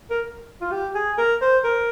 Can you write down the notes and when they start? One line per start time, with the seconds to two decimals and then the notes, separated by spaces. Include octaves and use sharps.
0.10 A#4
0.61 F4
0.71 G4
0.95 G#4
1.18 A#4
1.41 C5
1.64 A#4